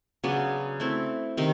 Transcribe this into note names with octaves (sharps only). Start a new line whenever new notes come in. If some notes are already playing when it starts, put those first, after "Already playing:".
C#3 F#3 B3 D4
A3 C4 E4
C3 D#3